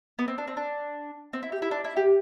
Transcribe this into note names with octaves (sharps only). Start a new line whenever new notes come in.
B3
C4
D4
C4
D4
C4
E4
G4
E4
D4
E4
G4